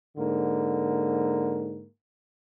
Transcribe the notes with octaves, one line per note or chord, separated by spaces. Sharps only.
G#2 D3 A#3